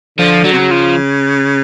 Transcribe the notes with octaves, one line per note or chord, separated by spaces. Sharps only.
D3 F3
F#3
C3
C#3
F3